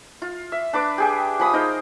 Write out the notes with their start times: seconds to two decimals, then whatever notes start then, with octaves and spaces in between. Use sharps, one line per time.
0.22 F4
0.52 E5
0.73 D4 B4 D6
0.98 G4 G#4 G5
1.39 F3 G#4 B5 D#6
1.53 D#4 A#4 C5 D#5